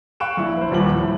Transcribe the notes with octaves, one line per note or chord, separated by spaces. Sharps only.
F5 G5 C#6 F#6 D7 E7
A#1 E4 F#6
B4 C5
D#1 D#2 F3 G3 F#7
A2